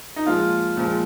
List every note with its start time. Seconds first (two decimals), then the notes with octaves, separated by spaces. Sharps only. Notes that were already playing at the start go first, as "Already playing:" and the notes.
0.16 D#4
0.26 A#2 F3 G#3 F4
0.77 A#2 F3 G#3